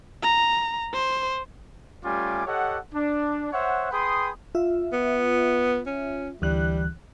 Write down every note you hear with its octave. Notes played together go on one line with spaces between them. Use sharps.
A#5
C5
G3 A3 C#4 F4 G#5 D6
G4 A4 C#5 D#5 F#5
D4
C5 C#5 E5 F#5
G#4 B4 G5 C6 D#6
F4 E5
B3
C#4
D2 E3 G3 F#6